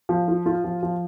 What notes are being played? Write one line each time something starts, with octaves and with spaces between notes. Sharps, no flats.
F3
F4
F4
F3
F3